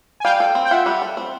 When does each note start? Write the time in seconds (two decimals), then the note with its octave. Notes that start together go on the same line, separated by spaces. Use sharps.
0.20 G#5
0.25 G3 F5 G5
0.40 A4
0.55 C4
0.65 G5
0.71 F4 E5 F#5
0.86 G3
1.02 A4
1.17 C4